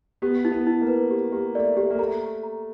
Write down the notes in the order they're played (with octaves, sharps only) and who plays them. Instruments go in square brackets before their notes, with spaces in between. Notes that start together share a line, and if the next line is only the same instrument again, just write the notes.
[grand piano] B3 [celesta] G4
[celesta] E4
[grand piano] B3
[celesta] E4
[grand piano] A#3
[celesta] B4
G4
[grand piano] A#3 [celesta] G4
[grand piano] A3 [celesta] D5
[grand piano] A3 [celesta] G4
[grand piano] A#3
[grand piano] A3 [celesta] A#5
[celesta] A#5
A#5